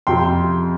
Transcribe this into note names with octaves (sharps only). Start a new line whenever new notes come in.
F2 C3 G5 C6